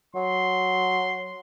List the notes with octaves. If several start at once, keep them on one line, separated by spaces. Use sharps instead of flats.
F#3 C6